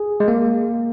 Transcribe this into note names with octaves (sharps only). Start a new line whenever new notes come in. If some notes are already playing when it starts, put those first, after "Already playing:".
Already playing: G#4
G#3
A#3